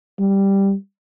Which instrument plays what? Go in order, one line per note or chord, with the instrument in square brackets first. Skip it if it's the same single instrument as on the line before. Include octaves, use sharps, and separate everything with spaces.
[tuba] G3